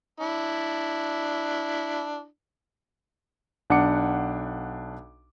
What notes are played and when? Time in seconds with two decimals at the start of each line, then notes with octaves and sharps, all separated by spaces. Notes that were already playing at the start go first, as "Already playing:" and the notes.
0.20 D4 E4
3.70 B1 D4 F#5 D6 C#7